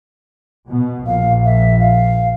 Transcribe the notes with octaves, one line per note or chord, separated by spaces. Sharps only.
B2
A#1 F5
E5
F5